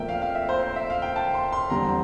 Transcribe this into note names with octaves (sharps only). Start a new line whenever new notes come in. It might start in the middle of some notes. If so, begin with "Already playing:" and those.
Already playing: A#2 F3 A3 C4 A#4 E5 G5
F5
F5
E5
C5
C5
E5
F5
G5
A5
C6
C6
E2 D3 G3 C4 A#5